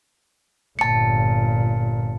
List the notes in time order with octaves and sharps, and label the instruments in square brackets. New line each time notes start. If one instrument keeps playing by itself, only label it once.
[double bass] G1 A#2 [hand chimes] A5 C#7